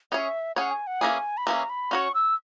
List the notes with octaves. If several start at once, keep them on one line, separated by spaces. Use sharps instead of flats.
C#4 G#4 C#5 E5
C#4 G#4 C#5 F#5
G#5
F#5
E3 A#3 C#4 G#4 G#5
B5
E3 A#3 C#4 G#4 A#5
B5
C#4 F#4 C#5 C#6
E6